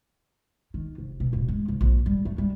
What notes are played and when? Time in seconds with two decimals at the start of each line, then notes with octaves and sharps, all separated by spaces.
0.74 D#3
0.98 F1
1.20 B2
1.33 D1
1.48 G#3
1.68 F1
1.81 A#1
2.06 G3
2.25 A3
2.38 G3